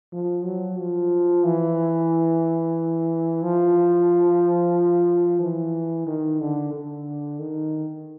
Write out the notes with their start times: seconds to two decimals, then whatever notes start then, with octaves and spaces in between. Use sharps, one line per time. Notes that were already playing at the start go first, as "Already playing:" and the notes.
0.12 F3
0.45 F#3
0.78 F3
1.44 E3
3.43 F3
5.41 E3
6.07 D#3
6.40 D3
6.73 D3
7.39 D#3